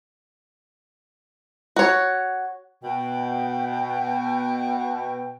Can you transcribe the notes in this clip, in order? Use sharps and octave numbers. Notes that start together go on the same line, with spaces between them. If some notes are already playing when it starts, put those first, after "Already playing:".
F#4 C#5
B2 G5